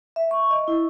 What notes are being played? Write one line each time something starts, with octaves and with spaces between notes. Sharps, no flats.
E5
C#6
D#5
E4